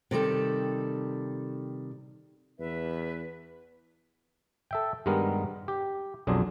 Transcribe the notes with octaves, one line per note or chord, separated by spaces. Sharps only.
C3 D#3 G3 A4
E2 B4 E5
A4 E5 G5
G2 D#3 G3 G#3 B3 A#4
G4
B1 F2 F#3 D4 G#4 C5